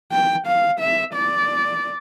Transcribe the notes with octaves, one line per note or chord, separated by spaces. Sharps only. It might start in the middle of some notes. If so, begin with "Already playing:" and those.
G5
F5
E5
D5